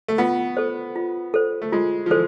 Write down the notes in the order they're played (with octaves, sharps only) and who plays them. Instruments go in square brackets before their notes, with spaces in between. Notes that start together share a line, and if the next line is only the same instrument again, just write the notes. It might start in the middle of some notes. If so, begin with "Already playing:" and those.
[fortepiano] A3
[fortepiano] B3 [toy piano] F4
[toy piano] A4 C5
F4
A4 C5
[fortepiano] A3
[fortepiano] G#3 [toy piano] F4
[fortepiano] F3
[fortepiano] E3 [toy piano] A4 C5